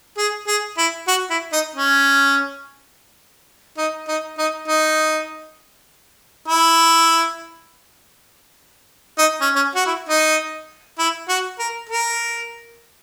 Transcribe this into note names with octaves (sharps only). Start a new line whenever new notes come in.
G#4
G#4
E4
F#4
E4
D#4
C#4
D#4
D#4
D#4
D#4
E4
D#4
C#4
C#4
F#4
E4
D#4
E4
F#4
A#4
A#4